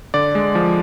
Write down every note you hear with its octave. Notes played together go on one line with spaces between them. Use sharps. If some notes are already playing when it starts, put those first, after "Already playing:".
D3 D5
G#3
F3